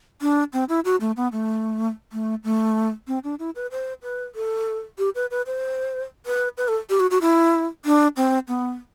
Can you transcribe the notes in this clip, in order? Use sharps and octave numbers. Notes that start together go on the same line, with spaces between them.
D4
C4
E4
F#4
A3
B3
A3
A3
A3
C4
D4
E4
B4
C5
B4
A4
G4
B4
B4
C5
B4
B4
A4
G4
F#4
F#4
E4
D4
C4
B3